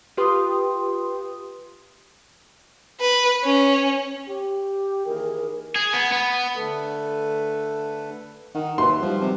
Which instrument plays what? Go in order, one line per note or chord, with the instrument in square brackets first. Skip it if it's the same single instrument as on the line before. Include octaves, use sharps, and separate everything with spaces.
[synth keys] F4 G4 B4 G5 C6 D#6
[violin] B4
C#4
[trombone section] G4
[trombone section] D#2 E3 G#4 [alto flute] A#4
[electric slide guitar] G#4
B3
B3
[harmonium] D3 A3 A4 B4
[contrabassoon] D#3 [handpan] F#5
[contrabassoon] D#2 [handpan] D#4 F#4 E5 [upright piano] B4 C6
[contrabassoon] F3 [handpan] G3 G#3 G4
[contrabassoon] C3